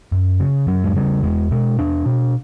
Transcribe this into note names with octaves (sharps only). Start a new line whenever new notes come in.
F#2
C#3
F#2 F#3
G#3
C#3 G3
E2 G#3
B2 G#3
E2 D4
B2